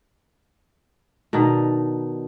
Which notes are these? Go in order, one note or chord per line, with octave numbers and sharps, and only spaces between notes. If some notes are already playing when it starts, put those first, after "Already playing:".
B2 D#3 D4 D#4